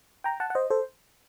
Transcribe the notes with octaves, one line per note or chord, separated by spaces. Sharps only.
G5 A#5
F#5 A5
F#5
C5 D#5
A4 C5